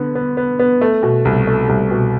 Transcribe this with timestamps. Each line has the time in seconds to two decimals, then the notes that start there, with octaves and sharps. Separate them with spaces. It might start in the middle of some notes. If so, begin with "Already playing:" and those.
Already playing: D3 B3
0.15 B3
0.37 B3
0.59 B3
0.81 A3
1.03 B2
1.25 C2
1.47 A3
1.69 C2
1.91 B2